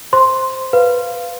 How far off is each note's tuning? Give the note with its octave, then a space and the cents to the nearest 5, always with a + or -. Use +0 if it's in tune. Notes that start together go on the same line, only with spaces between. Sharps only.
C5 +0 C6 +0
B4 +0 F5 -5